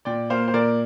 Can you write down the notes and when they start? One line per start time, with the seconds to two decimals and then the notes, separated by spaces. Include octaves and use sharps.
0.05 A#2 D5 G5
0.30 A#3 C5 F5
0.48 C5
0.54 A#2 A#4 D5